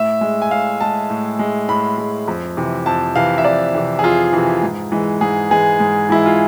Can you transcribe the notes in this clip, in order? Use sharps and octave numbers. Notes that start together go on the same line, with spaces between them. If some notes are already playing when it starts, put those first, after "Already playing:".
Already playing: A2 E5
G#3
G#5
A2 F5
G#3 A5
A2
G#3
A2 B5
G#3
F2
C3 E3
F2 A5
C3 E3 F5
E5
F2 D5
C3 E3
G#4
F2 F4
C3 E3
G#2
E3 G#3
G#2 G#4
E3 G#3 G#4
G#2
E3 G#3 E4
F4